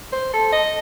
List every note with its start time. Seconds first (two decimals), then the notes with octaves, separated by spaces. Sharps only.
0.12 C5
0.33 A4
0.52 D#5